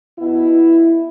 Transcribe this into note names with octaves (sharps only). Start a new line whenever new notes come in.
B2 B3 E4